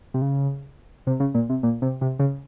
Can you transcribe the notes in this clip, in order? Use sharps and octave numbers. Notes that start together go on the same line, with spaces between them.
C3
C#3
C3
C#3
A#2
C3
A#2
C3
C3
C#3